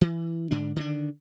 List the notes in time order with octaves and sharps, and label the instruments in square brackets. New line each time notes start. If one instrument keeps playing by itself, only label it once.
[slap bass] E3
G#2 D3 D4
D3 D#3 C#4 D4